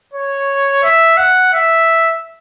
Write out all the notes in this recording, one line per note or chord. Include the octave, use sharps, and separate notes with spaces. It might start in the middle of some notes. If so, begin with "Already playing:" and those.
C#5
E5
F#5
E5